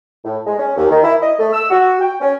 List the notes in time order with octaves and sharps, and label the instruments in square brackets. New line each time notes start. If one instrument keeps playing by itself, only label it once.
[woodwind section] A2
G#3
C#4
D#2
D#3
E4
D#5
A3
E6
F#4
G5
C#4